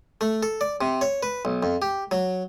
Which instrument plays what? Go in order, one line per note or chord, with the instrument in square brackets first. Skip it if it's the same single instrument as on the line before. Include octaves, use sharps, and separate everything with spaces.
[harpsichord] A3
A4
D5
C3
C#5
B4
B1
F2
G4
F#3